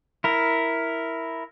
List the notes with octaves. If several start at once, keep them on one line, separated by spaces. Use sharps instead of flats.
E4 A#4